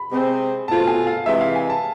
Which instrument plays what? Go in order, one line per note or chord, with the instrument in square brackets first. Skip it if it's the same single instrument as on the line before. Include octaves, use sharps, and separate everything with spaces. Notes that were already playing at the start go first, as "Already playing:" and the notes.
Already playing: [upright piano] B5
[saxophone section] C3 G#3 C4 G#4
[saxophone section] B2 A3 C4 F4 [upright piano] A5
[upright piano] G#5
F5
[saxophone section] C3 E3 G#3 [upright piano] E5
[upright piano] F5
G#5
A5